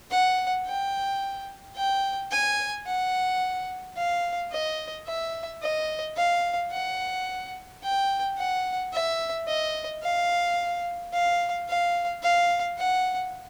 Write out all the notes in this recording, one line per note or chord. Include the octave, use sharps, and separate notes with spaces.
F#5
G5
G5
G#5
F#5
F5
D#5
E5
D#5
F5
F#5
G5
F#5
E5
D#5
F5
F5
F5
F5
F#5